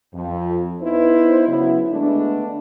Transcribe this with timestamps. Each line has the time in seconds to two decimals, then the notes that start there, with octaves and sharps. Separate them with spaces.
0.14 F2
0.81 B3 D#4 E4 B4 C5
1.47 C#3 F#3 B3 E4
1.91 D3 G#3 A3 B3 D4